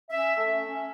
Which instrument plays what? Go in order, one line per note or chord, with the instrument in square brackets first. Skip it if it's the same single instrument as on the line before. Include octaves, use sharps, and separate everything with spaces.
[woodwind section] C#4 E5
A3
C#4